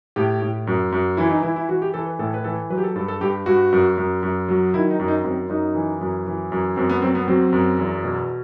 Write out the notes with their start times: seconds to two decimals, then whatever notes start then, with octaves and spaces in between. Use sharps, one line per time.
0.16 A2 G4
0.42 A2
0.67 F#2
0.92 F#2
1.17 E3 E4
1.30 D#4
1.43 E3 E4
1.56 E4
1.69 E3 F#4
1.82 G4
1.94 E3 A4
2.06 B4
2.19 A2 A4
2.34 B4
2.44 E3 A4
2.70 F#3 B4
2.78 G4
2.84 A4
2.96 G2 A4
3.08 A4
3.21 G2 G4
3.46 G2 F#4
3.73 F#2
3.98 F#2
4.23 F#2
4.49 F#3
4.74 D#3 E4
4.91 D#4
5.00 F#2
5.08 D#4
5.24 F#2 C4
5.49 F#2 D#4
5.75 E3
6.01 F#2
6.27 E3
6.52 F#2
6.76 F#2 C4
6.89 B3
7.02 F#3 C4
7.15 B3
7.28 F#3 C4
7.53 F#2
7.79 E2
8.04 B2